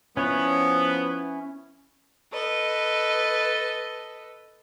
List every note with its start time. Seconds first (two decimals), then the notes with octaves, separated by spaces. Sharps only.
0.17 F3 B3 C#4 E4 C#5
2.32 A4 B4 D#5